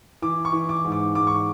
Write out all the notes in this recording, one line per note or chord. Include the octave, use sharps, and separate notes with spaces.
E3 D6
C#6
E3
D6
G#2
D6
G#2 D6
C#6